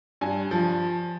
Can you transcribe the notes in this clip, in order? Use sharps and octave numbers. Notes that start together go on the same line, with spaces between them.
G2 G#5
F3